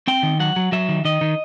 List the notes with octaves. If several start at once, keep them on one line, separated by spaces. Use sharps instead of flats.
C4 G5
D#3
F#3 F#5
F#3
F#3 E5
D#3
D#3 D#5
D#3